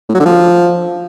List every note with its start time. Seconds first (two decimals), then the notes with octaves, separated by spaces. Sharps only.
0.09 A2
0.14 F#3
0.20 D3
0.25 F3